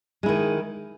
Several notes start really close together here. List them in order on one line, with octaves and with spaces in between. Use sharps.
G#3 E4 D#3